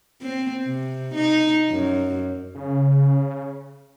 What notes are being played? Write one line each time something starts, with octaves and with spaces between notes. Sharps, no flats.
C4
C3
D#4
F#2
C#3